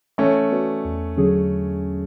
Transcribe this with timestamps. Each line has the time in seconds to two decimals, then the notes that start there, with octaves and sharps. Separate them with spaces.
0.18 E3 A3 C#4
0.51 B3 F#4 B4 D5
0.85 E2
1.17 D3 F#3 C#4 G#4